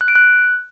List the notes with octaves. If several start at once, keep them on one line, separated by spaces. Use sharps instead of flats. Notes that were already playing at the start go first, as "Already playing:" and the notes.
F#6
D7
F#6